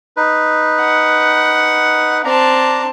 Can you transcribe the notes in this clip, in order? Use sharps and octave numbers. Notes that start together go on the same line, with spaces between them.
D#4 B4
F#5
C4 D4 A5 A#5